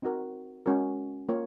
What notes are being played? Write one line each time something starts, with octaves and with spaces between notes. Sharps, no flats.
C4 D#4 F#4 A#4
G#3 C#4 F#4 A#4
A#3 F4 A#4 C#5